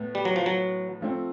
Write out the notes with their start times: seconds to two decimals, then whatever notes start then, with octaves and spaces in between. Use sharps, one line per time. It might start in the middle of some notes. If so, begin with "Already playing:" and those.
Already playing: A2 B3
0.15 G3
0.25 F#3
0.36 F3
0.46 F#3
1.01 F3 A3 C4